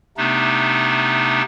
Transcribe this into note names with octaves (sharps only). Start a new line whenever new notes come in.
C3 A3 B3 D4 D#4